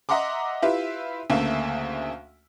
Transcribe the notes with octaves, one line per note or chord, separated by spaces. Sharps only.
D#5 E5 F#5 A#5 C6 D6
E4 F4 G4 B4 E5
D2 C#3 A3 A#3 E5